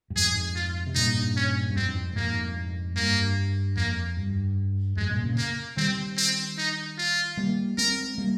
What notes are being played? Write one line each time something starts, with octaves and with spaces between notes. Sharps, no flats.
G2
F2 G#2 G#4
F4
C3
G2 A#2 D#4
C#4
G2
F2 G#2 C4
F2 G#2 A#3
G2 A#3
F2 A#3
G2
F2 G#2 G#3
G2 A#2
A#2 C#3
A#3
D#3 G3 C4
C4
D#4
F4
G3 A#3
G#3 C4 A#4
G3 A#3